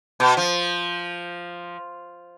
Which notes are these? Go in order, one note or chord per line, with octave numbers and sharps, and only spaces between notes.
B2
F3